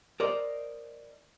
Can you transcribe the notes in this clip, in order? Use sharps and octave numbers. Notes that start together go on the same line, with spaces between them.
A#4 C5 D5 D#5